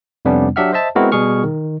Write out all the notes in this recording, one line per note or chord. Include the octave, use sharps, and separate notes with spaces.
F2 C3 G3 B3 C#4 D4
F#3 D4 G4 E5 F#5 F6
C5 D#5 E5 A5
G#3 B3 C4 E4 F#4 A#4
B2 G3 G#4 C#6 F6
D#3